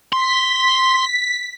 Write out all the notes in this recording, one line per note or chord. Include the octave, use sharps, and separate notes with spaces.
C6 B6